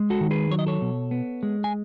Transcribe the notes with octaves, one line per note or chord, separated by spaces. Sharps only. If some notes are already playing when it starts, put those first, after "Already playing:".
Already playing: G#3
F#4 A4
D#3
G#4 B4
F#3 C#5
D#5
A4 C#5
B2
B3
G#3
G#5